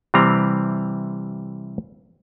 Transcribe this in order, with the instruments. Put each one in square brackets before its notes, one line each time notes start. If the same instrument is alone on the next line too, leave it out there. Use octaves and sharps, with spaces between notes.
[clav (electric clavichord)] C3 E3 G3 C4 A#5